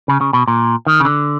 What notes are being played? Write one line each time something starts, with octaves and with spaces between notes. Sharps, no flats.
C#3
C#3
B2
A#2
D#3
C#3
D3